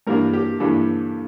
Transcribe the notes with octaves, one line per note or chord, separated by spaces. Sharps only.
G2 E3 G3 A#3 D4 A#4
G4
G2 E3 G3 A#3 D4 A4